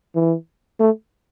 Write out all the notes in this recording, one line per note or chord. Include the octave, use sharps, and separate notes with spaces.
E3
A3